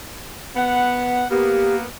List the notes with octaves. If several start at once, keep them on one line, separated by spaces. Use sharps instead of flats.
B3 F#5
A#3 B3 G4